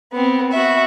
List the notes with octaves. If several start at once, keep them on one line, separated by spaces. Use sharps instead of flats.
B3 C4
F#4 E5